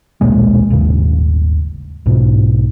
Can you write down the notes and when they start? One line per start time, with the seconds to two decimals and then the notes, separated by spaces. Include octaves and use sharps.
0.21 D#1 B1 A#2 G#3
0.70 D#1 G#1 C#3
2.06 B1 G#2 B2